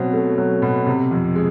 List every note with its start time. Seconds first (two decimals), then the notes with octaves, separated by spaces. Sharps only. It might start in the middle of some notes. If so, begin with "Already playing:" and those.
Already playing: B2 F#3 C4
0.13 A3
0.38 F#3
0.62 B2
0.86 C3
1.11 F2
1.35 G#3